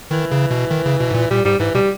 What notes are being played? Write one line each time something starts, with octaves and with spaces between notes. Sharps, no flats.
D#3 E3
C#3
B2
D#3
C#3
B2
G#2
A#2
A#2 G3
G#2 G3
G#2 E3
B2 G3